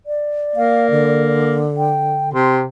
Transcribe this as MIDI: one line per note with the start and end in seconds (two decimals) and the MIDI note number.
0.06 1.44 74
0.56 1.63 58
0.56 0.90 77
0.91 2.34 50
1.77 2.33 79
2.34 2.64 48
2.34 2.56 84